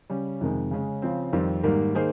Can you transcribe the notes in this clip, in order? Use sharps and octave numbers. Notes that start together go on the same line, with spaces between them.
C#3 G3 C#4
F2 C3 D#3 G#3
C#3 G#3 C#4
C#3 F3 C4
F2 D#3 G3 C4
G#2 D#3 G3 A#3
D#3 A#3 D#4 G#4 C5